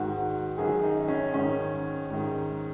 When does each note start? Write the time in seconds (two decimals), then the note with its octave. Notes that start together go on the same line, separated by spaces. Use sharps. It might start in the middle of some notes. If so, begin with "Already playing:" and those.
Already playing: G#2 D#3 F#4
0.58 F#2 D#3 G#4
0.83 D#4
1.08 C#4
1.34 G#2 D#3 C#4
2.10 G#2 D#3